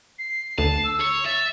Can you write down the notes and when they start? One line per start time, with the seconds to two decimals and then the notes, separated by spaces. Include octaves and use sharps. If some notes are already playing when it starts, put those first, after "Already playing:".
0.18 C7
0.58 D2 A5
0.84 E6
1.00 C#5
1.25 E5 A6